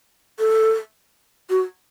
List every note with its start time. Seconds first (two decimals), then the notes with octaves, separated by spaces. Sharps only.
0.39 A4
1.50 F#4